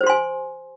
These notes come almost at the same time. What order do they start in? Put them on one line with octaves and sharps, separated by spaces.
C5 G4 C6 G#5